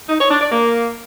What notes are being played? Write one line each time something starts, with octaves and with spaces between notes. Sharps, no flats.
D#4
C#5
D4
D5
A#3